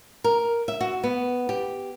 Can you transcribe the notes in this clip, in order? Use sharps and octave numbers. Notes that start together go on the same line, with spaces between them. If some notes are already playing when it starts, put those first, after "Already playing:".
A#4
E5
F#4
B3
G4